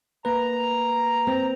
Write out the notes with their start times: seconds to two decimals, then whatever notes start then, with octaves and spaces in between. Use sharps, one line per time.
0.25 A#3 B4 A#5
1.27 C4